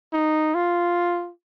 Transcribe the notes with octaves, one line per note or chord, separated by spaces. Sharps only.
D#4
F4